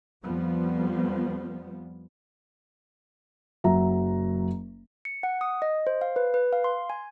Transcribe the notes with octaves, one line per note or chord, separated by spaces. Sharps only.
F2 F3 G3 B3
F#1 F#3 E5 A#5
C#7
F#5
D#6
D#5
C5
F5
B4
B4
F5
C6
G#5